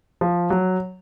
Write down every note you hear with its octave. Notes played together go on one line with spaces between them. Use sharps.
F3
F#3